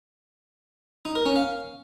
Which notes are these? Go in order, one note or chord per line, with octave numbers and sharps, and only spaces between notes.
D#4
A#4
C#4
F5